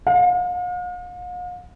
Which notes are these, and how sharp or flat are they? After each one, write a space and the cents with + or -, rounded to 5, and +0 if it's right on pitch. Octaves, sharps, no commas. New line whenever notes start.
F5 +45